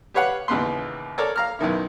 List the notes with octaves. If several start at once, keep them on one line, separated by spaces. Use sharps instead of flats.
G4 B4 C#5 F5 F#5
A1 D#2 C#3 B3 B4 C6
A4 A#4 C#5 D5
F5 A#5 F6
B1 F#2 D#3 E4